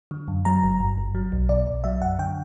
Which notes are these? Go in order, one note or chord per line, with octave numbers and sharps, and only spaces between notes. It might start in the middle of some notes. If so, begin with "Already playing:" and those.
D3
F#2
F#3 A#5
G1
G2
G1
F#3
B1
B2 D5
B1
F#3 E5
F#2 F#5
D3 G5